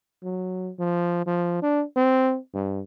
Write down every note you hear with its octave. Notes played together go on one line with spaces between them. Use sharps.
F#3
F3
F3
D4
C4
G2